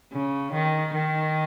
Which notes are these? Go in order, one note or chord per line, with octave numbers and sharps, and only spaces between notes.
C#3
D#3
D#3